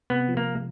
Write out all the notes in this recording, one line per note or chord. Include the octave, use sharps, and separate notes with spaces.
C3 B3
F3
A#3